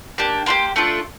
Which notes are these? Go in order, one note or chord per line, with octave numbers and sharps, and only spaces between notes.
A#3 D4 G4
A#3 D4 G4 C6
A3 D4 F4 A4